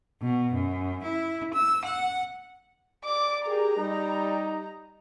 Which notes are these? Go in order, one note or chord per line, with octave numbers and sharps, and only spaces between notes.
B2
F#2
E4
E6
F#5
D5 D6
G4 G#4 A#4 A#5
G3 D#4